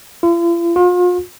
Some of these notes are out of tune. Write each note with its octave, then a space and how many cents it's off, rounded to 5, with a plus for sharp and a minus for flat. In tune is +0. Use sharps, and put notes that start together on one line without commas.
F4 -45
F4 +40